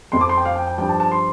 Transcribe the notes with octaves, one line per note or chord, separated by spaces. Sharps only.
F2 F3 C6
D6
C6
G5
F5
G5
G5
G2 F3 G5
A5
A5
C6